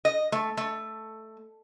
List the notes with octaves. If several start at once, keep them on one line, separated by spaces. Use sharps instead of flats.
D#5
A3
A3